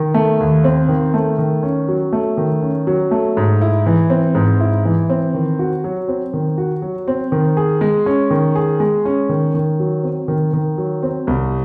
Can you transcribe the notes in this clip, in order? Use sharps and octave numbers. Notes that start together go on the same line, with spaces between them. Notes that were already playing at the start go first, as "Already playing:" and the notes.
Already playing: D#3
A3
D#2
C4
D#3
A3
D#3
C#4
F#3
A3
D#3
C#4
F#3
A3
G#2
E4
E3
C4
G#2
E4
E3
C4
D#3
F#4
F#3
C4
D#3
F#4
F#3
C4
D#3
G#4
G#3
C#4
D#3
G#4
G#3
C#4
D#3
D#3
F#3
C4
D#3
D#3
F#3
C4
C2